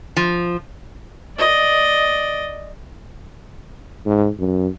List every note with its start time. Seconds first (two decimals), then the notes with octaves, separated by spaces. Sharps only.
0.17 F3
1.38 D5 D#5
4.06 G#2
4.39 F#2